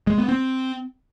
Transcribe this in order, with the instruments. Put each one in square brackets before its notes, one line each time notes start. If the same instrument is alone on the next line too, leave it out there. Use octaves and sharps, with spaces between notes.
[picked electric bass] G#3
B3
C4